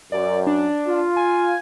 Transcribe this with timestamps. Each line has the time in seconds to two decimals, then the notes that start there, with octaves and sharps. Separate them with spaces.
0.12 F#2 D5
0.47 D4
0.87 F4
1.16 G#5